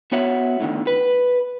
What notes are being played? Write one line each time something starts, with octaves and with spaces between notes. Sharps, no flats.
B3 F#4 C#5 E5 F#5
A2 D3 D#3
B4